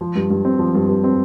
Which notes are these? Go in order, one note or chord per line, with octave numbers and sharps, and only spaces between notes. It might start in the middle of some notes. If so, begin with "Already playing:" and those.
F3
G2
G2
C4
F3
G2
G2
C4